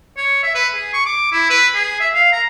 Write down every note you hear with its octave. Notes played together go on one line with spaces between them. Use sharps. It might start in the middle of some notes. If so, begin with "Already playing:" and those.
C#5
E5
B4
G#4
C#6
D6
E4
B4
G#4
E5
F5
A#5